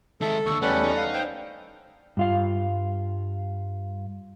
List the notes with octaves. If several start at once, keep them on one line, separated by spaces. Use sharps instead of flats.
D#3 G#3 A4 E5
D#2 D3 C#6 E6
E2 G3 A3 C#4 A4 B4 D5 F#5
D#4
F5
C5 G5
G2 F4 F5